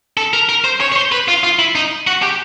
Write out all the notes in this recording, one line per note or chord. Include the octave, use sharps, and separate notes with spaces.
A4
A#4
A#4
C5
C#5
C#5
C5
B4
F4
F4
E4
D#4
F#4
G4